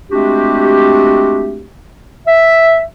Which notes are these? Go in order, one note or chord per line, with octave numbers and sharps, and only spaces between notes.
G#3 A3 C4 D4 F#4 G4
E5